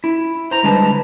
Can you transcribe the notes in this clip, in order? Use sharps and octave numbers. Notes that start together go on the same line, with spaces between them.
E4
C5 A#5
D3 G3 G#3 D#4 B4 A5